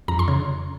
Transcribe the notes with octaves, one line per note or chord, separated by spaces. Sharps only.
F2 A#5
C6
C#3